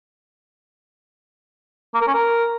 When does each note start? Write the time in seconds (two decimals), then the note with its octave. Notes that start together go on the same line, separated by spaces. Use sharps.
1.94 A#3
2.01 A#4
2.07 C#4
2.14 A#4